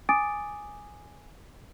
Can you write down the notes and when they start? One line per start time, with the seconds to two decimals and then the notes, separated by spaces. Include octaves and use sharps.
0.09 G#5 D6 D#6 A6 D7